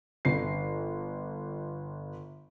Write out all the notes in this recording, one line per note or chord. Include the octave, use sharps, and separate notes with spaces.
G1 C7